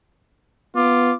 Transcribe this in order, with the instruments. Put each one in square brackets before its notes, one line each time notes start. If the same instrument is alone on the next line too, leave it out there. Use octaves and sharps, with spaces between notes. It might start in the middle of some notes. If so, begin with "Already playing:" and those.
[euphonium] B3 [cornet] F4 [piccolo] D6